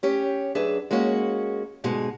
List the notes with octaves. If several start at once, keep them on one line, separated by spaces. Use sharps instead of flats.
C#4 G4 C#5
F#2 D4 G#4 B4 E5
G#3 A#3 C#4 F#4
D2 G#2 B2 G#3 G#5